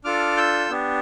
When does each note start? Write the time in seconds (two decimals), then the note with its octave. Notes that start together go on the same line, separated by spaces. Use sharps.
0.05 D4 F4 A4 D6 F6
0.37 E6 G6
0.70 B3 D4 G4